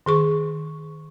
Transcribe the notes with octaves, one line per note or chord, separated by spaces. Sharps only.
D#3 G#4 C#6